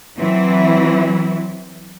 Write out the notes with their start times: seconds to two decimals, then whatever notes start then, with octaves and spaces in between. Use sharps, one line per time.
0.17 E3 F#3 C4 E4